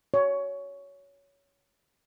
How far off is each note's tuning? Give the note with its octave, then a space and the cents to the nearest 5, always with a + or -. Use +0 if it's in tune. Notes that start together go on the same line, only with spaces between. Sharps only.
C#5 +15